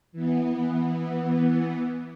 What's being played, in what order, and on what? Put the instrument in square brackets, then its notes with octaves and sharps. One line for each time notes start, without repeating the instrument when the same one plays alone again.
[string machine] E3 B3